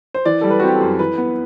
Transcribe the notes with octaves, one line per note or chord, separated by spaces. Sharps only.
C5
E3 D5
G3 A4
B4
F#4
C4 G4
A4
F#2
E3 B4
B3